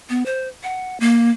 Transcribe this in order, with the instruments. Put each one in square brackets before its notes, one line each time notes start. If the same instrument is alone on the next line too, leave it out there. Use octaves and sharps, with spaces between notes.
[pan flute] B3
C5
F#5
A#3